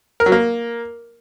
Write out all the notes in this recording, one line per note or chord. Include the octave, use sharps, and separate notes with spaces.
A#4
F#3
A#3